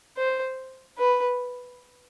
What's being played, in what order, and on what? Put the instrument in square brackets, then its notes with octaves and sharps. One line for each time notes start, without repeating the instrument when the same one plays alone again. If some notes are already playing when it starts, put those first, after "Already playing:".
[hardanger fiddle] C5
B4